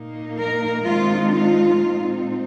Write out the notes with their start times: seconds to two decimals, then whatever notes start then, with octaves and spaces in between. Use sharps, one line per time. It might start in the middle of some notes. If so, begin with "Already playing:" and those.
Already playing: A#2 A#3 D#4
0.37 A#4
0.84 D#3 G#3 C4 D#4 F4
1.31 F4
1.77 A#2 G#3 C4 D#4